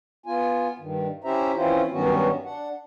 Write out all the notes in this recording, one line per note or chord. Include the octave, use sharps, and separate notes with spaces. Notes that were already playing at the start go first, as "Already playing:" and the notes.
B3 F4 G#5
G2 D#3
C#4 E4 G4 C5 E5 A#5
E3 C4 C#4 E4 F4 C5
G2 D#3 F#3 B3 C#4 F#4
D4 F#5